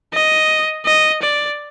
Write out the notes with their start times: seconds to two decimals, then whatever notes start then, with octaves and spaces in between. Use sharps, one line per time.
0.14 D#5
0.86 D#5
1.22 D5